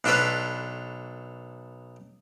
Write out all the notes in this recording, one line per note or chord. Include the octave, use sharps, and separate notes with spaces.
B1 D4 F4 A4 B4 C#5